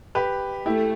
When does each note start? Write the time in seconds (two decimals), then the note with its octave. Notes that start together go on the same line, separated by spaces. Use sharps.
0.15 G4 B4
0.65 A3 E4 G4